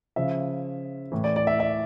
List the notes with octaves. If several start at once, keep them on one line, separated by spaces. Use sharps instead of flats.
C#3 F3 E5
A2 E3
D5
D5
E5
E5